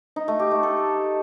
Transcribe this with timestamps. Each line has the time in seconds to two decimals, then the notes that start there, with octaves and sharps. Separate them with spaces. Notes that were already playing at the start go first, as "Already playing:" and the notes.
0.16 D#4
0.28 A3
0.40 G4
0.51 A3
0.63 A4